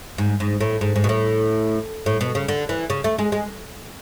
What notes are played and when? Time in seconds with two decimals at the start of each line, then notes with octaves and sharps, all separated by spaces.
0.18 G#2
0.40 G#2
0.61 A2
0.81 G#2
0.96 G#2
1.04 B2
1.09 A2
2.06 A2
2.21 B2
2.35 C#3
2.48 D3
2.69 E3
2.90 C#3
3.04 A3
3.19 G#3
3.32 G#3